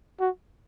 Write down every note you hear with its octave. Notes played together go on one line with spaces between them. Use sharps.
F#4